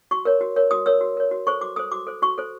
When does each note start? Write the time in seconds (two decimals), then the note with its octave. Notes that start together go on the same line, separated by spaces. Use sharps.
0.11 F#4 C#6
0.25 A#4 C#5
0.41 F#4
0.56 A#4 C#5
0.71 F#4 D#6
0.86 A#4 C#5 E6
1.01 F#4
1.17 A#4 C#5
1.31 F#4
1.47 A4 C5 C#6
1.61 F#4 D6
1.76 A4 C5 D#6
1.92 F#4 D6
2.07 A4 C5
2.22 F#4 C#6
2.38 A4 C5